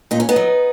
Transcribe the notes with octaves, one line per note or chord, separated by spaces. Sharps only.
A#2 D#4
C#4
B3 D#4
F#3